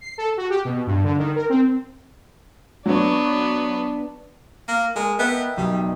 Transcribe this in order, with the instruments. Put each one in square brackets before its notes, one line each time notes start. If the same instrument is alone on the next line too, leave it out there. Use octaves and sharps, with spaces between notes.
[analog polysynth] C7
A4
F#4
G4
B2
G2
D3
D#3
A#4
C4
[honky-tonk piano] F#3 C#5 [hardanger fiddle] B3 D4
[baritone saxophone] A#3
[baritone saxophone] G#3 [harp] A#4 A5
[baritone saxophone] B3 [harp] D#5 E5 G5
[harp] B1 [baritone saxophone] G3